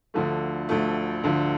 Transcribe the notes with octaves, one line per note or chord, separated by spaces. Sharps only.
D2 D3 F3 A3
D2 D3 F3 A3
D2 D3 F3 A3